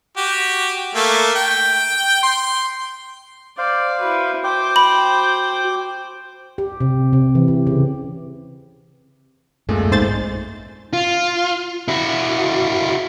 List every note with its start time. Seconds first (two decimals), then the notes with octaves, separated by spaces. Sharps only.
0.17 F#4 G4
0.95 A3 A#3
1.35 G5
2.23 C6
3.58 C5 D5 F5
4.01 E4 F#4 B4
4.44 C5 G5 D6
4.76 B5
6.58 G4
6.80 C3
7.13 C3
7.35 E3
7.48 G4
7.67 C#3
9.69 D1 F#2 A#2 G#3 A3 C4
9.91 A#1 G#2 B3 C4 C5 A6
10.93 F4
11.88 E4 F#4